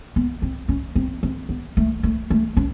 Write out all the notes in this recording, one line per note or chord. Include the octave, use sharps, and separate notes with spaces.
B3
C4
C#4
C4
C4
B3
A3
A3
A3
C#4